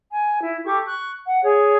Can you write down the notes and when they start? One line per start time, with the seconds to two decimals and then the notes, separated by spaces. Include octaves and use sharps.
0.11 G#5
0.42 E4
0.65 G4 A4 C#6 D6
0.86 C#6 F#6
1.25 F#5
1.43 G#4 C#5